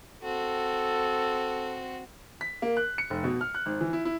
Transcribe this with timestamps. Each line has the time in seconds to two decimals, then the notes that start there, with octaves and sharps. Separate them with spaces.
0.23 C4 F#4 A4
2.41 B6
2.62 A#3
2.77 F#6
2.98 C#7
3.10 F1
3.24 B2
3.41 F6
3.55 F#6
3.66 G#1
3.81 E3
3.93 E4
4.05 E4